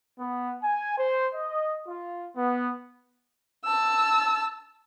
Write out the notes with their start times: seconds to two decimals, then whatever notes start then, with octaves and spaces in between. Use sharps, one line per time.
0.19 B3
0.62 G#5
0.98 C5
1.34 D#5
1.87 F4
2.36 B3
3.65 A5 E6